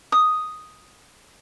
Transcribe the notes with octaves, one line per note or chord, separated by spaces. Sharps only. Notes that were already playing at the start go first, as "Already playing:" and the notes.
D#6